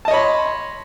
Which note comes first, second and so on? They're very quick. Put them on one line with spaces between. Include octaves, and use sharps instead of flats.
A5 D#5 C#5 B5 C6